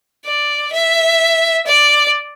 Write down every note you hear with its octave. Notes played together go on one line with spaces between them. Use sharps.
D5
E5
D5